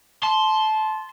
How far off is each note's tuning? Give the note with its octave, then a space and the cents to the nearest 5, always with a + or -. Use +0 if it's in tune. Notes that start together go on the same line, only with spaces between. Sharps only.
A5 -20 C6 +0